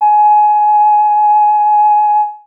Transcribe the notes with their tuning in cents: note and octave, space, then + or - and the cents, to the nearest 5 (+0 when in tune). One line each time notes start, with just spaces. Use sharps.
G#5 +20